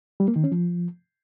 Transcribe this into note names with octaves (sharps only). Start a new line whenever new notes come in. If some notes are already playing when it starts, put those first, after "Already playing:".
G3
A#3
D#3
C#4
F3